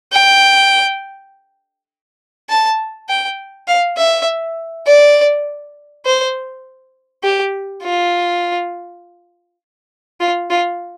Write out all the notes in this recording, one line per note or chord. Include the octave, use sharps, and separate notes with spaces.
G5
A5
G5
F5
E5
D5
C5
G4
F4
F4
F4